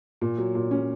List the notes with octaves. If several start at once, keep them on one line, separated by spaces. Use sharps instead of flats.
A#2
F#3
A#2
C#4